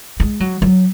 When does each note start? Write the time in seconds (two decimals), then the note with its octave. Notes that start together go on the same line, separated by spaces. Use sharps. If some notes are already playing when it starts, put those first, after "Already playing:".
0.20 G#3
0.40 F#3
0.62 F#3